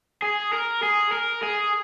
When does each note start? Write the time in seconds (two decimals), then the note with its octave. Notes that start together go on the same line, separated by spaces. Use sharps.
0.22 G#4
0.53 A#4
0.83 G#4
1.12 A#4
1.43 G#4